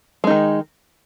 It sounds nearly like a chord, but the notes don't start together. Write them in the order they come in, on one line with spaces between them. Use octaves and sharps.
G#3 D#4 D#3